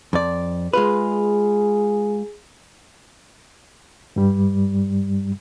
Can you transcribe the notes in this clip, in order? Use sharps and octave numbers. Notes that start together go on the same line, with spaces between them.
F2 D5
G#3 F4 G#4 B4
G2 G3